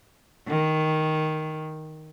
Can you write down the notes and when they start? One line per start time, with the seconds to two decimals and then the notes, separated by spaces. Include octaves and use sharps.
0.47 D#3